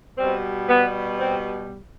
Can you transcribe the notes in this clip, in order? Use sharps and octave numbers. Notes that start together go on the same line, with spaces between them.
G3 C4
B2
B3
C4